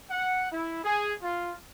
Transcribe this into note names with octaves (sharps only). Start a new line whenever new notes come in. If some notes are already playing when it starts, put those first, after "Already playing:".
F#5
E4
G#4
F4